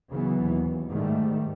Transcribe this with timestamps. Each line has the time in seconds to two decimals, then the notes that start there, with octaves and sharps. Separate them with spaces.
0.12 C#3 E3 F#3 B3
0.46 D#2
0.90 G#2 D#3 G3 A3